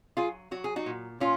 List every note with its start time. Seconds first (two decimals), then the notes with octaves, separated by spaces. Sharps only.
0.17 F#3 F4 G#4
0.51 F#3 F#4
0.64 G#4
0.76 D#4 F#4
0.86 A#2
1.20 A#2 C#4 F4